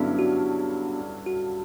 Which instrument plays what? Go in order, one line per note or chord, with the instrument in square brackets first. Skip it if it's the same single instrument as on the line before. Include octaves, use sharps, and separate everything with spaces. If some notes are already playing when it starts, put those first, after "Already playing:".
Already playing: [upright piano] G2 D3 F#3 C#4 E4 [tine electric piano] B3 D4
[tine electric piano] F#4
F#4